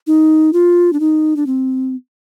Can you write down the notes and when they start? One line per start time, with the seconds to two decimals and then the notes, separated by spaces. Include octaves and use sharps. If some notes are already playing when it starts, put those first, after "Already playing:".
0.07 D#4
0.53 F4
0.93 D4
1.00 D#4
1.36 D4
1.46 C4